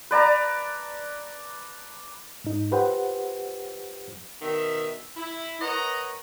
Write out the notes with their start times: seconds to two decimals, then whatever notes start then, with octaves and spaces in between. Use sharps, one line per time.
0.11 B4 D5 A5 A#5
2.44 G#2 D#4
2.71 F4 G4 B4 C5 F#5 G5
4.42 B2 D#3 E5
5.17 E4
5.61 A#4 B4 C#5 D#5 F#5 A#5